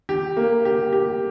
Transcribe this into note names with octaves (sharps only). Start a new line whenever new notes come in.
G4
A#3
G4
G4